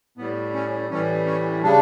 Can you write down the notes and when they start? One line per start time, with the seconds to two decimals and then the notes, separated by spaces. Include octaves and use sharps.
0.17 A2 G3 B3
0.54 C#4
0.90 A2 E3 G3 C#4
1.26 C#4
1.62 C#3 G3 D4